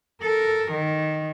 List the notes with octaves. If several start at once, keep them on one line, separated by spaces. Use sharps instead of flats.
A4 A#4
D#3